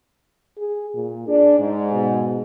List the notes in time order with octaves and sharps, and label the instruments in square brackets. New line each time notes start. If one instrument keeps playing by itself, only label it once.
[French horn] G#4
A#2
[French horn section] D4 [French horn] G#4
[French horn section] G#2
[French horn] B2